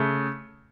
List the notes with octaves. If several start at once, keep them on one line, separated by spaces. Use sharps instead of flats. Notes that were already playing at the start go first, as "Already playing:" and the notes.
Already playing: C#3 A3